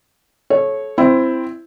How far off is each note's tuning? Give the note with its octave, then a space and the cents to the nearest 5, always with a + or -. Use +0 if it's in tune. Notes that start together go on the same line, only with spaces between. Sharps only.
A4 -30 C#5 -15
C4 +0 E4 +15